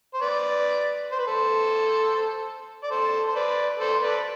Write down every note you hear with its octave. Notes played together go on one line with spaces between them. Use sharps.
C5
B4 D5
C5
B4
A4 C5
D5
A4 C5
C5
B4 D5
A4 C5
B4 D5